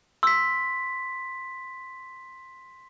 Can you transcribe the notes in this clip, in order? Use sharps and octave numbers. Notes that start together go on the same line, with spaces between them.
C6 E6 B6